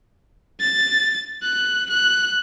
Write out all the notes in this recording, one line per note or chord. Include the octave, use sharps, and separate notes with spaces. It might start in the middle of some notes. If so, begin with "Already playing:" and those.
A6
F#6
F#6